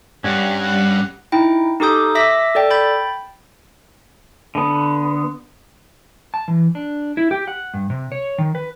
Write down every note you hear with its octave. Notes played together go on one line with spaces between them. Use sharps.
G2 G3 C#4 F#5
F#5
D#4 E4 G5
D#4 G4 A4 D6 D#6 G6
E5 D6 E6 A#6 B6
A4 D5 G5
G5 B5 G6 A6
D3 B3
A5
E3
D4
E4
G4
F#5
G2
C3
C#5
D#3
B4